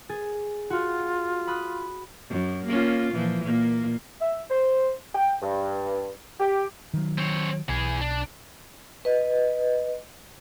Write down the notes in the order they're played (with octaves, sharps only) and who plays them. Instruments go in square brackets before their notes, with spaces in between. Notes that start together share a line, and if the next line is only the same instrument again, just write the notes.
[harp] G#4 A6
[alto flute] F4 [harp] F#4
[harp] B5 D#6 F#6
[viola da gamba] F#2
A#3 C#4 F4
A#2 E3 F3
A#2 A#3
[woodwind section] E5
C5
G5
G2
G4
[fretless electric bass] D#3 F#3
[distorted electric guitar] C4 C#5
[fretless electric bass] B1 [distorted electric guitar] E3 G#4
[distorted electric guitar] D4
[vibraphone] B4 D#5